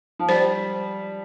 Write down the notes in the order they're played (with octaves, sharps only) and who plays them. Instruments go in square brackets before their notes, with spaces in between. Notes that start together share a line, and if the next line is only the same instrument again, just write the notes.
[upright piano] F3
[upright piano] G3 [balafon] C5